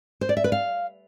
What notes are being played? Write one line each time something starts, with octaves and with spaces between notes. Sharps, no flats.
C5
D5
E5
B4
F5